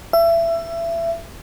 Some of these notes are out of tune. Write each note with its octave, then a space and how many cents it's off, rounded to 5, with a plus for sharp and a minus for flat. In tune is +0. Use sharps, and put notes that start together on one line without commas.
E5 +25